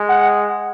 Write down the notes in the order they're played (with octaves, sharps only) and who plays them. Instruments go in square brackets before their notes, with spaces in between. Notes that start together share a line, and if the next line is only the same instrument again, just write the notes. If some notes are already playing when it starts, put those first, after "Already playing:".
Already playing: [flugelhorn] G#3
[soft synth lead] F#5